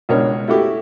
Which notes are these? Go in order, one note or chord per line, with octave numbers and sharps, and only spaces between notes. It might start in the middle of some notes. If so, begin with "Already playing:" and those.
C#2 B2 D4 A#4 C#5
A3 E4 F#4 G4